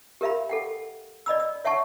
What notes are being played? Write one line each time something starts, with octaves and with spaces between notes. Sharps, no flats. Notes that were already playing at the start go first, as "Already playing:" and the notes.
G4 A#4 E5 F5 B5
A4 F#5 G5
D5 D#5 B5 E6
E6
C#5 E5 F#5 A5 C#6